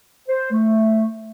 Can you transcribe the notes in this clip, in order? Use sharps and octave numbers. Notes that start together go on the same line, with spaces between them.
C5
A3